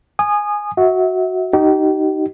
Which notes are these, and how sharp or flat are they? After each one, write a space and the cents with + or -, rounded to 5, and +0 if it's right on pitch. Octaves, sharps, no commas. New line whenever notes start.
G#5 +0 D#6 -25
F#4 +0 E5 -30
D#4 +0 G4 -40